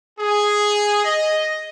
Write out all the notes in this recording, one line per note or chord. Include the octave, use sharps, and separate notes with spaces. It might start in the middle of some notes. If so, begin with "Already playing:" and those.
G#4
D#5